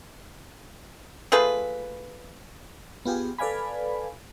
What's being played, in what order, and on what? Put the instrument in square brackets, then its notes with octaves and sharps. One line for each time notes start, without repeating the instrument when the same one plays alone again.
[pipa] A3 F4 G#4 B4
[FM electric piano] B3 F4 G4 G#4
A4 B4 D5 F5 G#5 B5